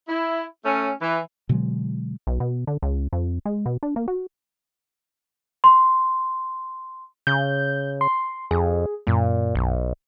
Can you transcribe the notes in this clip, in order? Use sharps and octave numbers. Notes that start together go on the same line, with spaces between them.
E4
A3 C#4
E3
B2 D3 F#3 G#3
B1
B2
D3
C#2
F2
G#3
B2
D4
A#3
F#4
C6
C#3 G6
C6
F2 G#4
F#2 A#2
B1